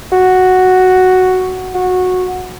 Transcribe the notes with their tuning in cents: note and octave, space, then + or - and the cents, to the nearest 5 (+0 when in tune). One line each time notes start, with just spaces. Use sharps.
F#4 +0
F#4 -15